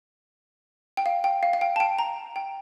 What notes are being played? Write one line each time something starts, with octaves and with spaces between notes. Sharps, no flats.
G5
F5
G5
F5
F5
G5
A5
G5
A#5
G5